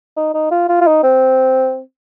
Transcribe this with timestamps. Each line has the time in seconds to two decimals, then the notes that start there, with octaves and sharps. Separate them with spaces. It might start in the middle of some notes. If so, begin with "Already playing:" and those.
0.16 D#4
0.34 D#4
0.51 F4
0.69 F4
0.81 F4
0.87 D#4
1.03 C4